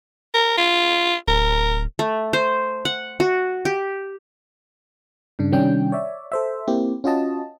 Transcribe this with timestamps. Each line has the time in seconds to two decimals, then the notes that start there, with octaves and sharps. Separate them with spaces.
0.34 A#4
0.57 F4
1.28 D1 A#4
1.99 A3
2.33 C5
2.85 F#5
3.20 F#4
3.65 G4
5.39 G2 C#3 D4
5.52 C3 D#3 G3 C#4 D4 G5
5.92 C#5 D5 E5
6.32 A4 C5 E5
6.68 A#3 C4 E4 G4
7.04 C#4 F4 F#4 D#5 A5